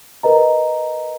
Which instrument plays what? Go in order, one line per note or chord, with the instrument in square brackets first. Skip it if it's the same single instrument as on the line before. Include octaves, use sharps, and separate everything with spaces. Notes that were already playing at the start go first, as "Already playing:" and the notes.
[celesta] A#4 B4 D#5 A#5